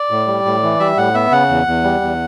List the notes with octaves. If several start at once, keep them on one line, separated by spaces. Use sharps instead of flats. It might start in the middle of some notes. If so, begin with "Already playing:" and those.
Already playing: D5
A2
G3
A2
E3
G3 E5
A2 F#5
B3 E5
C#3 F#5
E2
E2
G3
E2